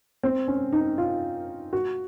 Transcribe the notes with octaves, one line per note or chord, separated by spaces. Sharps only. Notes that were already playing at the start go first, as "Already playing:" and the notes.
C4
C#4
D#4
F4
F#4